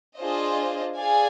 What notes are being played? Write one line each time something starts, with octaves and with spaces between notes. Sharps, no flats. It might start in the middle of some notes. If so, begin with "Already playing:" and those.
D4 F4 G#4 C5 D#5
G#4 D5 F5 G#5